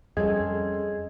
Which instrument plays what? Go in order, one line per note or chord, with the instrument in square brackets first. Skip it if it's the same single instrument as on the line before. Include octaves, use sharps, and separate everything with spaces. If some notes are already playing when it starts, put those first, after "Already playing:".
[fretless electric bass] F2 G3 [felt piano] C4 C#4 A4 [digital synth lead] G#4 [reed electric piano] D#5